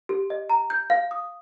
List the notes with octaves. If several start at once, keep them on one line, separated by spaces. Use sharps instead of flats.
G4
D#5
A#5
G6
F5
D#6